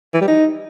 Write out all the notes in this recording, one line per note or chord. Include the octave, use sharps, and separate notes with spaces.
E3
G3
D#4